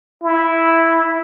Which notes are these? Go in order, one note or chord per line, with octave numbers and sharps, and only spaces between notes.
E4